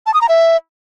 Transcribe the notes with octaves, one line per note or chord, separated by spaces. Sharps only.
A5
D#6
A#5
E5